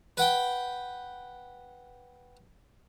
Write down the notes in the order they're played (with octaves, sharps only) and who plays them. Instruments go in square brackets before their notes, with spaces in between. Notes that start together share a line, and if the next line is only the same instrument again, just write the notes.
[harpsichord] B4 F#5 G5